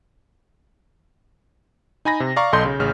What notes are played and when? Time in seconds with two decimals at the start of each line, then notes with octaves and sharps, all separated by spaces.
2.05 D#4 G#5 B5 A#6
2.20 C3
2.36 D5 F5 A#5 C#6
2.53 B1 A4 D#5 C6 G6
2.65 C#3
2.80 A1 C#3 F6